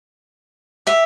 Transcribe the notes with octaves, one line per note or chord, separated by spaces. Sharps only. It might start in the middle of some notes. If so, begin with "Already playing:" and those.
G4 E5